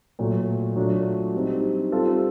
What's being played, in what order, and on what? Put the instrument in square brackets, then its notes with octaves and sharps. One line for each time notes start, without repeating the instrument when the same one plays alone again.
[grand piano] A#2 F#3 A3
F#3 A3 D4 F4
G3 C4 D#4
G3 C4 F4 A4